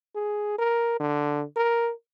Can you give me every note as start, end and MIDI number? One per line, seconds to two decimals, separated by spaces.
0.15 0.56 68
0.58 0.98 70
1.00 1.44 50
1.56 1.92 70